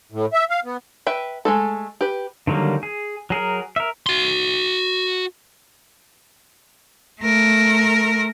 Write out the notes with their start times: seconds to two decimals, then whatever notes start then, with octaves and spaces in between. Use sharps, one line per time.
0.12 A2
0.33 E5
0.50 F5
0.65 B3
1.07 B4 E5 G5
1.45 G#3 A3 A4
2.01 G4 B4
2.47 D3 D#3 F#3 G3 A#3
2.83 G#4
3.30 F#3 G#4 A#4
3.76 A#4 E5
4.06 F#4 C6
7.21 A3 A#4